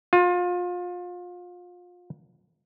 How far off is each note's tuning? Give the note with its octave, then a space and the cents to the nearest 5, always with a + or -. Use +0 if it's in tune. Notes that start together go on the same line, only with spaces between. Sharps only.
F4 +30